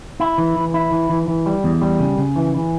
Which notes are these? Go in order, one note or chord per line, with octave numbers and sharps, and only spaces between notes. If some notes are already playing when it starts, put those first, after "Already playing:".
E4
E3
E3
E4
E3
E3
E3
G3
E2
G3
C#3
C#3
E3
E3